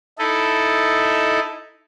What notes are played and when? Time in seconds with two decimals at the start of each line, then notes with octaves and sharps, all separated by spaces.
0.18 D#4 E4 A4